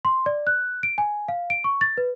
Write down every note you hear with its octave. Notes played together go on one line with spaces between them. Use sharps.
C6
D5
F#6
D7
G#5
F5
D7
C#6
A6
B4